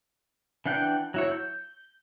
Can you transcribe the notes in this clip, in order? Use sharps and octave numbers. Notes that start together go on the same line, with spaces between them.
E3 D4 F#5 G5
F#3 E4 C#5
G6